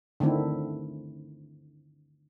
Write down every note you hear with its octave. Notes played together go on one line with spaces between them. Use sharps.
D3 D#3 A3 C4 E4